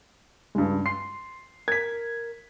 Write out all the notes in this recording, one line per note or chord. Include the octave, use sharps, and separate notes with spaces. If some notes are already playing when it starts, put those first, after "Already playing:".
C#2 G2 G3 G#3
C6 C7
A#4 G#6 B6